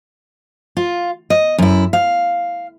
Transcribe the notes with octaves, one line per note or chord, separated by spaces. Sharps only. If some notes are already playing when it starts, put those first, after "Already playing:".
F4
D#5
F#2 E4
F5